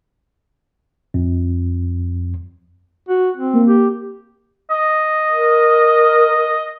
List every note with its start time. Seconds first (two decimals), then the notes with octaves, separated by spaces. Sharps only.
1.14 F2
3.09 F#4
3.37 C4
3.53 A#3
3.68 G4
4.71 D#5
5.32 A#4